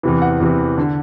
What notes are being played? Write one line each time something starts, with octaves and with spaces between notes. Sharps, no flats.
E2 C3 E3
F#5
E2 C3 E3
D3